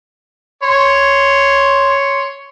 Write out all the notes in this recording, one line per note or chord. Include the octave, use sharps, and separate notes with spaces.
C#5 C6